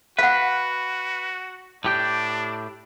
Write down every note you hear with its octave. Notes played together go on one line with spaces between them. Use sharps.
F#4 B4 F5 F#5
A2 D4 G4 G5